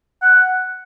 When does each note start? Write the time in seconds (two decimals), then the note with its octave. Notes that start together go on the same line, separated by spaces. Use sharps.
0.22 F#5